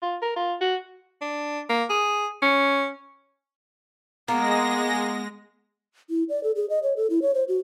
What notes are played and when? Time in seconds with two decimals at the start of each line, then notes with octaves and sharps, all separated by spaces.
0.02 F4
0.22 A#4
0.36 F4
0.61 F#4
1.21 D4
1.70 A#3
1.90 G#4
2.42 C#4
4.28 G#3 A#3 B3 A#6
6.10 E4
6.29 D5
6.43 A4
6.56 G#4
6.70 D#5
6.83 C#5
6.96 A4
7.10 E4
7.22 C#5
7.35 C5
7.48 F#4